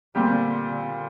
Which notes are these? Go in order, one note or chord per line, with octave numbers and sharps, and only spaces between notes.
A#2 D3 G3 C4 G4
D3